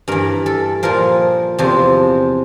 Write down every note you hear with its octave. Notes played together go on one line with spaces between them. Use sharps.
G2 E3 A#4
A4
A#2 F3 A#4
E2 C3 F3